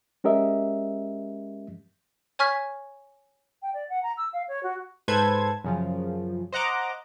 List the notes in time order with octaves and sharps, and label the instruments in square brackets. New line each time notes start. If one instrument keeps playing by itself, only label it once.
[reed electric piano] G#3 C#4 G4 A#4 D#5 E5
[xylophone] C#5 G#5 C#6 F6 G#6 B6
[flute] G5
D5
F#5
A#5
E6
F5
C#5
F#4
[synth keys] G#2 A4 B4 C5 G#6
F#2 C#3 F3
C5 D#5 F#5 A#5 D6